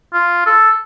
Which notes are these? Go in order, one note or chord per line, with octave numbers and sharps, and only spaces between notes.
F4
A4